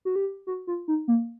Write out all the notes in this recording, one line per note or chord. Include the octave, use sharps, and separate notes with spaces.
F#4
G4
F#4
F4
D#4
A#3